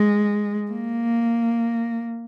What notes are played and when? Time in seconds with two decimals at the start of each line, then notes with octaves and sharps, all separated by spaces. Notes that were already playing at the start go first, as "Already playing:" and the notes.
Already playing: G#3
0.71 A#3